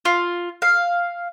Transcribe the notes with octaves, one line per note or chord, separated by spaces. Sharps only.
F4
F5